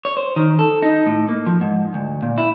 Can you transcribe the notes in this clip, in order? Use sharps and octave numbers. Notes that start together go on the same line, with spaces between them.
C#5
C5
D#3
A4
D#4
A2
A#3
F3
G#2
D2
A#2
E4